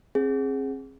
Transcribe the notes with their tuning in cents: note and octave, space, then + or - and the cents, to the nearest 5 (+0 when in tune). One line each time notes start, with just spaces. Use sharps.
C4 +40 G#4 +0